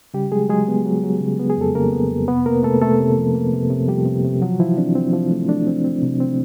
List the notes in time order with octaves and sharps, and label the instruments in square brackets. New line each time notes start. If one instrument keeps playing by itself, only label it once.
[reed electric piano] C#3 G3 G4
F#3 G#3 G#4
F#3 G#3 G#4
B3
F#3
F#3
C#3
B3
G#4
F2 A4
C#3 A#3 A#4
B3
F2
C3 B3 B4
C3 A#3 A#4
C3 A3 A4
C3 A3 A4
C3
F3
A#3
C3
C3
F3 G3 G4
C3
C3
F3 F#3 F#4
E3 F3 E4
C4 D4
C4
F3
A3
A3 D4
C4
C4
C3
C4